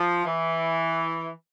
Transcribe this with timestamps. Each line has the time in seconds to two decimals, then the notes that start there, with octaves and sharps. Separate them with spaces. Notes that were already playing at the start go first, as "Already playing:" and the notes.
Already playing: F3
0.25 E3